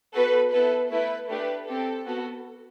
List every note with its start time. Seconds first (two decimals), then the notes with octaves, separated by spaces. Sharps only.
0.14 B3 F#4 A4 B4
0.52 B3 E4 A4 B4
0.90 A3 E4 A4 B4
1.29 A3 D4 G4 B4
1.67 C4 G4 A4
2.06 B3 F#4 A4